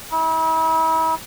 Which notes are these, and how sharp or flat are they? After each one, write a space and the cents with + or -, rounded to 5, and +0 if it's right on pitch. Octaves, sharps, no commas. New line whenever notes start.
E4 -40